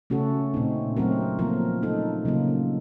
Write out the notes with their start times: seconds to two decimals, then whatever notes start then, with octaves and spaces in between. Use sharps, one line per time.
0.10 C#3 A3 C#4 F#4 A4
0.54 A#2 A3 C4 D#4
0.96 F#3 A3 C4 F#4 A#4
1.39 F3 A#3 F4 A#4
1.82 A3 D#4 A4
2.25 C#3 F#3 A#3 F4